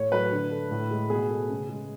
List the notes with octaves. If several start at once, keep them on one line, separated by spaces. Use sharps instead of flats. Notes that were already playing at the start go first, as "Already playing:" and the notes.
Already playing: A2 C#5
F#3 A3 B4
D3
A3
A2
G#3
B2 G#4
A3
C#3
G#3